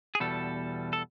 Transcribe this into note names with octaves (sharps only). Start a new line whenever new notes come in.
G#4
E2 B2 G3 A4
A4